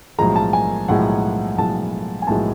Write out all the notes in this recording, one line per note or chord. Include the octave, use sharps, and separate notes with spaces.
B1 A2 F3 G#3 A#5
A5
G#5
B1 A2 F3 G#3 F#5
B1 A2 F3 G#3 A5
G#5
B1 A2 F3 G#3 A5